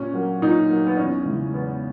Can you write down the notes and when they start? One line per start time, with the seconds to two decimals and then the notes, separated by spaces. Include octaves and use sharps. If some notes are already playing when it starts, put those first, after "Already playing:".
Already playing: A#2 C#4
0.13 F#3 A#3
0.42 A#2 D#4
0.69 F#3 A#3
0.87 B3
0.97 E2 C#4
1.25 C#3 E3 G#3
1.53 E2 B3